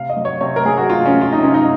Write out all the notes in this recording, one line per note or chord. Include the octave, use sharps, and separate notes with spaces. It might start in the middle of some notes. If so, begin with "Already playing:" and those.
Already playing: C3 F5
D#5
F#3
C#5
C3 C#5
A#4
F#3 G#4
F#4
C3 F4
C#4
F#3
F4
D#4
C3
C#4
D#4